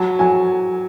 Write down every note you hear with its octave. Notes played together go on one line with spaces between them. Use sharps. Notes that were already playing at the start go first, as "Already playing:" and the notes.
Already playing: F#3 A5
F#3 G#5